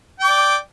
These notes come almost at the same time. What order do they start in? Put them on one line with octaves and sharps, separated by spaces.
G5 D6 D5